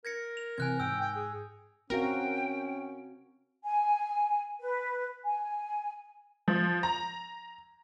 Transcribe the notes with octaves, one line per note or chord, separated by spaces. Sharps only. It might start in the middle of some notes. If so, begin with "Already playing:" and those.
A#4 G#6 A#6 C#7
F7
C3 E3 C4 G#5 F#6 G#6
G#2 G5 E6
G5
G#4
C4 C#4 F#4 A#4 F5 G5
G#5
B4
G#5
F3
A#5